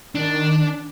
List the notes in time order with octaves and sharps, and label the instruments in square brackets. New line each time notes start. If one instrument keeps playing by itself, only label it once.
[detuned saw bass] D#3 [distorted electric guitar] D4